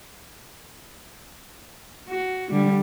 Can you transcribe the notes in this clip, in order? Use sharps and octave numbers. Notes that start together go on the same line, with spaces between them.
F#4
D3 G3